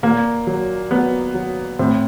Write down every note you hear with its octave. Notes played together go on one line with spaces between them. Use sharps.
A#2 A#3
F#3
F#3 B3
F#3
A2 C4